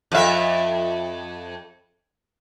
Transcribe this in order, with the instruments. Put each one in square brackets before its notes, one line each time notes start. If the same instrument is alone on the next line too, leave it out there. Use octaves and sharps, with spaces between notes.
[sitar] F2 E5